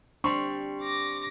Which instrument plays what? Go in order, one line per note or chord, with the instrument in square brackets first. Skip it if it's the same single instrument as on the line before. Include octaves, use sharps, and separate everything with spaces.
[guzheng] G3 C4 [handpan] D4 [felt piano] C6 C#6
[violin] D6 A#6